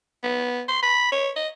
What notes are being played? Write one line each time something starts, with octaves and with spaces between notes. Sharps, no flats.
B3
C6
B5
C#5
D#5